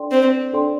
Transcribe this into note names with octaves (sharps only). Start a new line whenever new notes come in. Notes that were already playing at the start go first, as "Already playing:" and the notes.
Already playing: D4 A4 D5 G5 C6
C4
D4 A4 D5 G5 C6